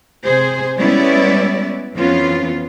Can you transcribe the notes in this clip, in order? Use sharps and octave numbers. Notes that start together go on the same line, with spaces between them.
C3 G#4 C5
G3 G#3 B3 C#4 E4 D5
F2 E3 F3 B3 C#4 F4